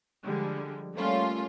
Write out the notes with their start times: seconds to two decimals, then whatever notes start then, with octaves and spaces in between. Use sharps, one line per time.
0.24 D3 F3 G3 G#3
0.94 G3 A3 A#3 C#4 F4